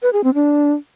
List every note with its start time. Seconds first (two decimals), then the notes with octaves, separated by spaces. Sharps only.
0.02 B4
0.13 G#4
0.24 C4
0.34 D4